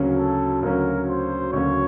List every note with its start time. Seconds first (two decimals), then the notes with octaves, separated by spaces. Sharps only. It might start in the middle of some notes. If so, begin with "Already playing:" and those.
Already playing: D2 C#3 F#3 A#3 C#4
0.18 A4
0.62 D2 C#3 F#3 A#3 C#4 A#4
1.08 C5
1.52 D2 C#3 F#3 A#3 C#4 C#5